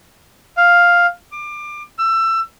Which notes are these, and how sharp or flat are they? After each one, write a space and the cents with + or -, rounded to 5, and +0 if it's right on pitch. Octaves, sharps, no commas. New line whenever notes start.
F5 +5
D6 +25
E6 +25